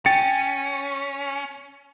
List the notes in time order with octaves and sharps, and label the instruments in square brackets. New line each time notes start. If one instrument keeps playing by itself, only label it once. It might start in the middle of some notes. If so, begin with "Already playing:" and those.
[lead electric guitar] C#4 [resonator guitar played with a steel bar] G5 [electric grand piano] A6 C#7